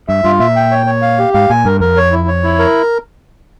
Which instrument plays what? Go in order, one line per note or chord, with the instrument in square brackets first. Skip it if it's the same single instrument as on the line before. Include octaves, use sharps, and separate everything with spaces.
[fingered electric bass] G2 [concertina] E5
[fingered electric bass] G2 [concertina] F4
[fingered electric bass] A#2 [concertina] E5
[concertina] G5
C#5
C#5
F5
G4
[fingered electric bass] G#2 [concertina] F5
[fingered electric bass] A#2 [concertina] G#5
[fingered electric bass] G2 [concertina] A#4
[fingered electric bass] F2 [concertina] A#4
[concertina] C#5
E4
C#5
E4
A#4